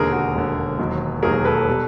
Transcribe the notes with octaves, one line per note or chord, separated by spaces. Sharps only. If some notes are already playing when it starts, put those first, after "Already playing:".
Already playing: E1 D#2 D3 G#4 A#4
F#4 G#4
E1 D#2 D3
E1 D#2 D#3 F#3
E1 D#2 D#3 F#3 G#4 A#4
A4 B4
B2 G3